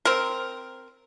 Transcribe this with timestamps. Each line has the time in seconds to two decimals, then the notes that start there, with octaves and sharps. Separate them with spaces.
0.05 C4 A#4